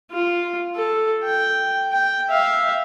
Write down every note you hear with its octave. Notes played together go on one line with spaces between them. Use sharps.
F4
A4
G5
G5
E5 F5